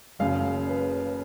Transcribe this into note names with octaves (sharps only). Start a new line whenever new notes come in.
F#1 F#2 C#3 F5
B4